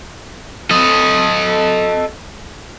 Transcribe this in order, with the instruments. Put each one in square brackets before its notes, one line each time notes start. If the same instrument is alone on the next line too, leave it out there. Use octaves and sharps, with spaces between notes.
[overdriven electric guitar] A4 D#5